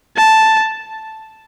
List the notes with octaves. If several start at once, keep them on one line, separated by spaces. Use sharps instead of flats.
A5